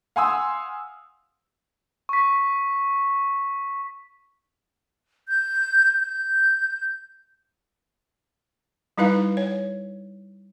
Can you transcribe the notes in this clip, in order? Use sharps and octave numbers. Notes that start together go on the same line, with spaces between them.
F5 F#5 G#5 C6 D#6 E6
C#6 B6
G6
G6
G3 D#4 E4 B4 F5
C#5